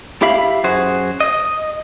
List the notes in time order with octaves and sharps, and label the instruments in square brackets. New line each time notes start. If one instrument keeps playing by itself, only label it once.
[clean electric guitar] E4 G4 E5 F5 B5
F#2 F#4 G#4 C5
D#5